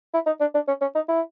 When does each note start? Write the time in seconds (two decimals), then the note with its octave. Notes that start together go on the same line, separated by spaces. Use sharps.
0.14 E4
0.26 D#4
0.40 D4
0.54 D4
0.68 C#4
0.81 C#4
0.95 D#4
1.08 E4